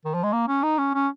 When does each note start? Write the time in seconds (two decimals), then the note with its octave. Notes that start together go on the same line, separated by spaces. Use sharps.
0.05 D#3
0.14 F3
0.23 G#3
0.33 A#3
0.48 C#4
0.63 D#4
0.78 C#4
0.94 C#4